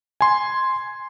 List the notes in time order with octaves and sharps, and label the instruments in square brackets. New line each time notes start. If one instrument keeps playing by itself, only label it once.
[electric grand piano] G#5 C6